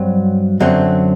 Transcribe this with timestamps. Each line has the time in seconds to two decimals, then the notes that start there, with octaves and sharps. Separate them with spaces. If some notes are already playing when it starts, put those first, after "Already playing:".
Already playing: G2 F#3 C4 F#4
0.60 F#2 D3 F#3 C4